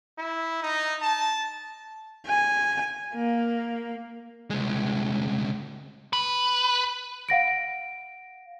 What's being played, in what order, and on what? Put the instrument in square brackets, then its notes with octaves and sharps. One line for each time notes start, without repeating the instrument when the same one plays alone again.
[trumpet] E4
D#4
A5
[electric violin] G#5
A#3
[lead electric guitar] C2 G#3
B4
[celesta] F5 F#5 A#6 D7